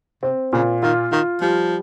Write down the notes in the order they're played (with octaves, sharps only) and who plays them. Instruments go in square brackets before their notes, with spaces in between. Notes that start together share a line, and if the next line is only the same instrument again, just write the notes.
[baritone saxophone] C3 [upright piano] C4
[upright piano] A#2 [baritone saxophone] C#3
[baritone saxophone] D#3 [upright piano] F4
[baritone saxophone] D#3 [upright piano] F4
[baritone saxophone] F3 [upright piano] G3